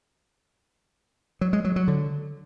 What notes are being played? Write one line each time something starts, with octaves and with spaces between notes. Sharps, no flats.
F#3
G#3
F#3
F#3
D3